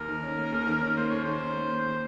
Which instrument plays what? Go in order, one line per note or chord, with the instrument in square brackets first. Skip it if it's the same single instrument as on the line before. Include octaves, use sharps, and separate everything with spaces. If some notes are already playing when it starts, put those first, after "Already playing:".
Already playing: [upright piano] D#2 A#3 [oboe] A#4
[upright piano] D#3
C#4
A#3
D#2
D#3
C#4
[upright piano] A#3 [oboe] C5
[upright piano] D#2 [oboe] C#5
[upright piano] D#3 [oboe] C5
[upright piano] C#4
A#3
D#2
D#3